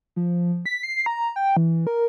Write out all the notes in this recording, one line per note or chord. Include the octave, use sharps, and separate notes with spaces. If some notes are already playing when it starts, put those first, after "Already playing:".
F3
B6
C7
A#5
G5
E3
A#4